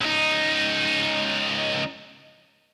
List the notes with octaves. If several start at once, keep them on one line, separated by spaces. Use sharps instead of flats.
C#2 D#4